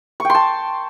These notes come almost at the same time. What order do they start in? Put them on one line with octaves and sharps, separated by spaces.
C#6 G5 C6 A5